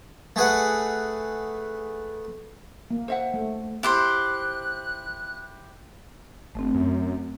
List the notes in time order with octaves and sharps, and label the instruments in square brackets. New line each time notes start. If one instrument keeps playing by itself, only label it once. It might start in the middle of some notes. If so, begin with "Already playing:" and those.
[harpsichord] A3 G#4 B4 F#5
[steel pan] A#3
[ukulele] C5 E5 F#5
[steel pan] A3
[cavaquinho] E4 G4 C5 [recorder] F#6
[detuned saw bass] G1 [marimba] A3 C4
[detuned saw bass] F#2